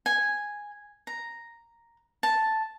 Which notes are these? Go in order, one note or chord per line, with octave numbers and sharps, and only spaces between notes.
G#5
A#5
A5